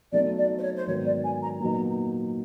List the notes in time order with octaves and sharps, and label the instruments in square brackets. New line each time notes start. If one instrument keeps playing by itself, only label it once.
[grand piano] B2 F#3 A3 C4 D#4 [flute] D5
[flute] D5
C5
C#5
C5
[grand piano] G#2 D#3 F#3 B3 [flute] C#5
[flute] D5
G#5
A#5
[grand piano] A#2 F#3 B3 D#4 [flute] A#5